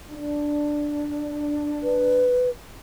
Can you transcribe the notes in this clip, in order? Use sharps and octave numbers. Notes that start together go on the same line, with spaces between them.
D4
B4